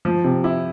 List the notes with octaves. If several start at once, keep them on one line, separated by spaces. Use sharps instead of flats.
F3
C3
E4